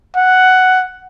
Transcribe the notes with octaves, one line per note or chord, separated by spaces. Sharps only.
F#5